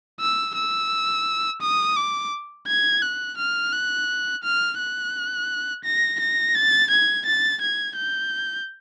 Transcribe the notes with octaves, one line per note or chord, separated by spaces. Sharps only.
E6
E6
D#6
D6
G#6
F#6
F6
F#6
F6
F#6
A#6
A#6
A6
G#6
A6
G#6
G6